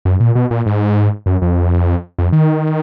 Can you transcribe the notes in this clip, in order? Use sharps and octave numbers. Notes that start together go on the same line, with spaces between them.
F#2
A#2
B2
A#2
G#2
F#2
F2
F2
D#3